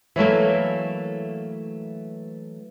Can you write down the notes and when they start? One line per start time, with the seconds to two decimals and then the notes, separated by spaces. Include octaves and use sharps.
0.16 E3 F#3 A3 A#3